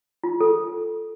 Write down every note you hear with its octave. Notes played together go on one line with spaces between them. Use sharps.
F4
A4